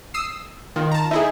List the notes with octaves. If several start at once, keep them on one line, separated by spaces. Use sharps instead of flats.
D#6 E6 C7
D#3 F4
A5 A#5
D#4 E4 G#4 E5